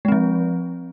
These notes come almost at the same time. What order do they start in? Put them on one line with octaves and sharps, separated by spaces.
G#3 C4 F3